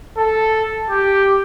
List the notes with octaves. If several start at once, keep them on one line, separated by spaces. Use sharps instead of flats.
A4
G4